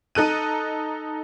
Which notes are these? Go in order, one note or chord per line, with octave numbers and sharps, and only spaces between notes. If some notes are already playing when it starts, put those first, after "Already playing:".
D#4 A4 F#6 D#7